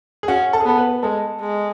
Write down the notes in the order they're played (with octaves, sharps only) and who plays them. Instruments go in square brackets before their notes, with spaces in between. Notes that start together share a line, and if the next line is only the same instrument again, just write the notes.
[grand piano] G#4
[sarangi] C#4 [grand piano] F#4
[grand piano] A4
G#4
[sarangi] B3 [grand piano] A4
[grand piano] B4
[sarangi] G#3 [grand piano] A4
[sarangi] G#3